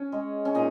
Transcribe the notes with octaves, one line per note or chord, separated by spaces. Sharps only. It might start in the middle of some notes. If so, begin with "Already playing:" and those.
Already playing: C#4
G#3
C#4
A#2 D#4